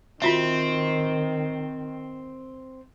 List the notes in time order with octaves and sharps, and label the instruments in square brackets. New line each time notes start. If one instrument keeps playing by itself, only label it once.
[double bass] D#3 [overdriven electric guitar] C4 [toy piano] F4 F#4 E5